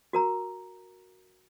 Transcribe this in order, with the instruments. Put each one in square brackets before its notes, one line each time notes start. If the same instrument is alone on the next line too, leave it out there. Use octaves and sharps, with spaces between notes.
[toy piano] F#4 A#4 A#5